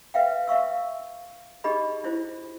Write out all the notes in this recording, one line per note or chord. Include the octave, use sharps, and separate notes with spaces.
B4 E5 F5 G5
E5 F5 C#6 E6
D4 D#4 G4 G#4 D#5 B5
D4 E4 F4 C5